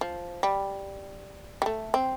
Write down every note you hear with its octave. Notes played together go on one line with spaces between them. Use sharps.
F3
G3
G3
A3
C4